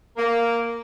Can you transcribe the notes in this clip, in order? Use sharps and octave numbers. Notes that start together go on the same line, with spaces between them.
A#3